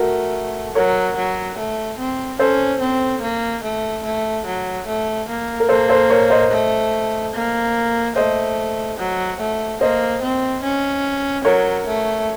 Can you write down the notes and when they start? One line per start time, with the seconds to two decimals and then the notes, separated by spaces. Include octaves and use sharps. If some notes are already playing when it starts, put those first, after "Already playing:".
Already playing: A3 F#4 A#4
0.75 F#3 A#4 C#5
1.16 F#3
1.58 A3
1.99 C4
2.39 C#4 A4 C5
2.81 C4
3.22 A#3
3.64 A3
4.05 A3
4.46 F#3
4.87 A3
5.28 A#3
5.60 A#4
5.69 A#3 A4 C5
5.89 A4 C5
6.10 A#4 C#5
6.30 C5 D#5
6.51 A3
7.34 A#3
8.16 A3 C5 D#5
8.98 F#3
9.40 A3
9.81 A#3 C5 D#5
10.22 C4
10.63 C#4
11.45 F#3 A#4 C#5
11.86 A3